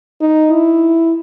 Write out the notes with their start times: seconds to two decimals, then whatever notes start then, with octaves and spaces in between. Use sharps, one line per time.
0.21 D#4
0.52 E4